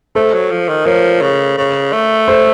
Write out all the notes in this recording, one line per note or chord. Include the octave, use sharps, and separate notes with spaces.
A3 A4 C5
F#3
F3
D#3
F3 A#4 C#5
C#3
C#3
A3
A4 C5